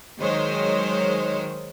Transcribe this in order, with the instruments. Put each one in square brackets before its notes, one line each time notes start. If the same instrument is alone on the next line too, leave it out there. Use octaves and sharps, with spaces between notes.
[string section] D#3 F#3 G#3 C5 C#5